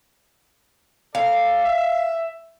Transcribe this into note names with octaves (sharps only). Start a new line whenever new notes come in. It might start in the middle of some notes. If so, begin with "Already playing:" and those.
A4 D5 F5
E5